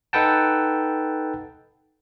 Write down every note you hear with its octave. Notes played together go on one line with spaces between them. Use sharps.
D#4 A4 B4 F#5 G5 A5